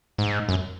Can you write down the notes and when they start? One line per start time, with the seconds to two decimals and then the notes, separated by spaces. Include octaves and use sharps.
0.18 G#2
0.49 F#2